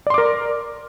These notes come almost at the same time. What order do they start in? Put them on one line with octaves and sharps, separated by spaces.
D5 C6 D6 A#4